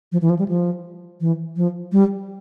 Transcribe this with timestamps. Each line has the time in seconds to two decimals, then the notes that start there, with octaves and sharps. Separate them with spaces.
0.12 F3
0.22 E3
0.30 F3
0.39 G3
0.48 F3
1.21 E3
1.57 F3
1.92 G3